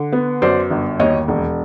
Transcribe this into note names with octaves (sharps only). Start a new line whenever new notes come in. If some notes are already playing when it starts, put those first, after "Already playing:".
Already playing: D3
B3
F#2 C5 D5
G1
D#2 C#5 D#5
E1